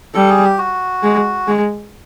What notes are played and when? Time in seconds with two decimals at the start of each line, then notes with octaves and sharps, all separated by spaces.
0.14 G3 A4
0.29 G#4
0.44 G4
0.58 F#4
1.03 G#3
1.47 G#3